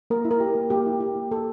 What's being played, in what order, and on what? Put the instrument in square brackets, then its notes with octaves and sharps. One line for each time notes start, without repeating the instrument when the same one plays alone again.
[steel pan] A#3 A#4
E4
A#4
G4
A#3
A#3 G4
E4
G4
A#3
A#3 A4